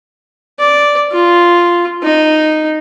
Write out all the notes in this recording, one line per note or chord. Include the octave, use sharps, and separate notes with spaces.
D5
F4
D#4